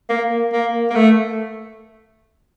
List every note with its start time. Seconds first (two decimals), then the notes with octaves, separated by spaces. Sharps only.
0.09 A#3
0.53 A#3
0.90 A#3
0.95 A3